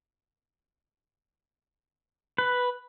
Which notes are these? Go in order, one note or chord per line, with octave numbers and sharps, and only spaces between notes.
B4